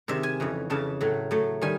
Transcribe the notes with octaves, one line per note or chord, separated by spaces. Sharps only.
C3 D#3 G#3 E5
G#5
F2 C#3 E3
F2 C#3 E3 A5
A2 F#3 A3
A2 F#3 A3
D#3 G3 G#5